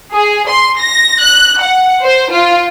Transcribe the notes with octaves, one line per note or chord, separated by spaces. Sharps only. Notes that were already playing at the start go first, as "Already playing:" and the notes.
G#4
C6
A#6
F#6
F#5
C5
F4